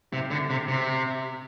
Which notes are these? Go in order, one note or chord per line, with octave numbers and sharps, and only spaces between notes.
C3
D3
C3
C3